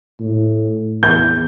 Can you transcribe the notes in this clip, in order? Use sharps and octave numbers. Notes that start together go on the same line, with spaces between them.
A2
E2 G6